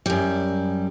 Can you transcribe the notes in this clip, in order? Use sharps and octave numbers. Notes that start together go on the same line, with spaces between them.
F#2 G3